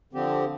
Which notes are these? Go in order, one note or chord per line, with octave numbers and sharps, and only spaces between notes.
D3 F3 C4 G4